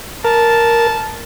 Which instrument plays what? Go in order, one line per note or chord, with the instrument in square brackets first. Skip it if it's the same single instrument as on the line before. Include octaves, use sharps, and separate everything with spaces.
[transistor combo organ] A#4 [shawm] A5